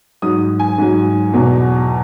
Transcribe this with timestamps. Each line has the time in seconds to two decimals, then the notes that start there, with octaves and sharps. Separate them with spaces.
0.22 G#2 F#3 D#6
0.59 G#5
0.78 G#2 F#3
1.33 E2 B2 F#3